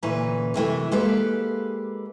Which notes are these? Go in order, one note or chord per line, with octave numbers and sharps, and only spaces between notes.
D2 A#2 E3 C#4 B4 A#5
F#2 C3 E3 A3
G#3 A#3 G4 A4 B4 F5